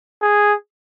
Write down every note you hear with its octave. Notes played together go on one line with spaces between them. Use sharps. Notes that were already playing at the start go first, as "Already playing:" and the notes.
G#4